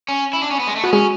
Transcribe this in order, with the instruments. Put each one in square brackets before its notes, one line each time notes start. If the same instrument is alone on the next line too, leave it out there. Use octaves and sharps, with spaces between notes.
[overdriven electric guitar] C#4
E4
D4
C#4
B3
G#3
A3
[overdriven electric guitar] B3 [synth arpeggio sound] F#4
[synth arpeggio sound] G#3 G#4 [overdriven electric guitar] C#4